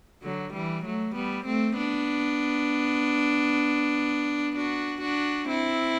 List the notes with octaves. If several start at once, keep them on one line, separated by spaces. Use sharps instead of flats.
D3 F#3
E3 G3
F#3 A3
G3 B3
A3 C4
B3 D4
D4 F#4
D4 F#4
C4 E4